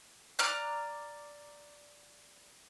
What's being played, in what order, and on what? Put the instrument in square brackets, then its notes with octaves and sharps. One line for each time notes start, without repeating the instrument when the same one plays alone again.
[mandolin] D5 A#5 F6 F#6